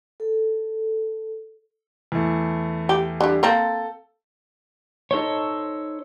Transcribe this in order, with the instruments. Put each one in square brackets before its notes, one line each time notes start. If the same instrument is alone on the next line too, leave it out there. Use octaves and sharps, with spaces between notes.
[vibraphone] A4
[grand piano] E2 A3
[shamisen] G4
D3 G3
[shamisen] A#3 C4 [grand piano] A4
[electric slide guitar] D#4 A4 C5 C#5